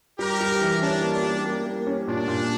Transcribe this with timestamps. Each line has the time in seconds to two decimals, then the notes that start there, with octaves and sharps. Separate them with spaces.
0.18 G3 G4 A#4
0.40 G3
0.61 E3
0.82 C#4 D4
1.03 A#3
1.13 D4
1.23 G3
1.45 A#3
1.66 A#3
1.87 C#4
2.07 A#2 D4
2.28 A#2